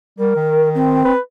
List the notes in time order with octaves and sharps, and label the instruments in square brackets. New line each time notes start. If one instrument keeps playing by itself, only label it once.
[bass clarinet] G3 [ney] A#4
[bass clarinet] D#3
[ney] C4
[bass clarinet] B4